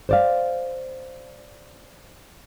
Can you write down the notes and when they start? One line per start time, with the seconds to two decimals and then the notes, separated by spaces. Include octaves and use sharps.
0.09 C5 D5 F5